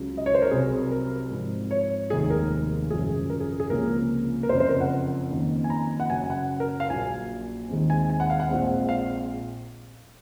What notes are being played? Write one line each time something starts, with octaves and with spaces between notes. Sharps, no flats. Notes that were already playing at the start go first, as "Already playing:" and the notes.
Already playing: C#2 C#3 F#3
D#5
C#5
C5
A#4
C2 C3 F#3 C4 G#4
A#4
G#2 F3 C4
C#5
F1 D#2 D#3 G#3 G#4
A#4
G#1 F#2 C#3 F3 G#4
A#4
G#4
G#4
C#2 C3 F3 A#3 C#4 A#4
A#4
F#1 F2 C#3 C5
C5
A#4
F#5
F2 D#3 A#3 C#4
G#5
A#5
F#5
F#1 F#2 C#3 G#5
F#5
A#4
F5
A#1 A#2 F#3 G#5
D#2 D#3 G#3 C4
G#5
G#5
F#5
F5
F#5
A#1 A#2 G#3 C4
F5